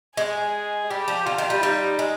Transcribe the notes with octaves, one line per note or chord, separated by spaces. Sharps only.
G#3 G#4
G3 G4
F3
D3 F4
D#3
G3
G3 D#4
G#3